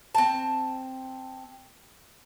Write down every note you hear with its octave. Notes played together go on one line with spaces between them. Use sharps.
C4 A5